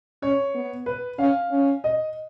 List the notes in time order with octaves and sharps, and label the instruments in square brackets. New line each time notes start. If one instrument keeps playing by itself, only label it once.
[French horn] C#4 [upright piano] C#5
[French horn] B3
[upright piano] B4
[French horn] C#4 [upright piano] F5
[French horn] C#4
[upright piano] D#5